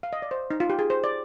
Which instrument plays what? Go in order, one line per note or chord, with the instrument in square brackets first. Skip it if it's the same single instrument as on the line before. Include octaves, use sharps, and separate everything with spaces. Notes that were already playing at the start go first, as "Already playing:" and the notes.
[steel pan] F5
D#5
D5
C5
D#4
F4
G4
G#4
C5
D5